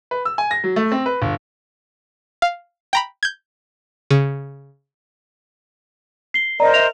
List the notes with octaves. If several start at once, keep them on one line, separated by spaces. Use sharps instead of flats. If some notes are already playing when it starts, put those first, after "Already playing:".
B4
E6
G#5
A#6
F#3
A3
C4
B4
G1
F5
G5 A#5 B5
G6 G#6
C#3
C7 G7
A#4 C5 D5 D#5 A#5
E5 F7